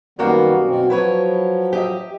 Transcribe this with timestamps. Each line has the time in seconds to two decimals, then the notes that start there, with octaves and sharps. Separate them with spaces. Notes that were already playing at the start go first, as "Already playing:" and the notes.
0.19 F#2 D#3 G3 A#3 B3 F#4
0.65 B2 C4
0.90 F3 F#3 E4 B4 C#5
1.73 G4 D#5 E5